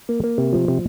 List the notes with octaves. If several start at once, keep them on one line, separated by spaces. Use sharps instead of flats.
A#3
A#3
C3
F3
C3